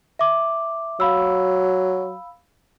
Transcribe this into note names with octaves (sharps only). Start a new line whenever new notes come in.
E5 D6
F#3 F5 B5 E6